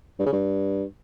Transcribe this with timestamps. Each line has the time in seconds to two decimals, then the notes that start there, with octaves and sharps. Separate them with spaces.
0.19 G2
0.26 C#3
0.33 G2